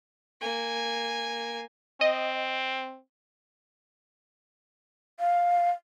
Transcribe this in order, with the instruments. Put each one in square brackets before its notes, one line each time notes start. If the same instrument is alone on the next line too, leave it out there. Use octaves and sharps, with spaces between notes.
[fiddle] A#3 G#5
[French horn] C4 [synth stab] D#5
[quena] F5